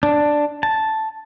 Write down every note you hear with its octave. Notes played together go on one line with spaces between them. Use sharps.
D4
A5